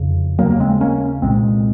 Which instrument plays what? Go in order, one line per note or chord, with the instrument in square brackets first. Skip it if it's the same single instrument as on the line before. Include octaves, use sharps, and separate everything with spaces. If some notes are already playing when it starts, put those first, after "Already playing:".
Already playing: [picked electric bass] F2 C#3
D#2 C#3 F#3 A#3
A#3
G#3 C4
A#3 C#4
C2 A#2 G#3 C4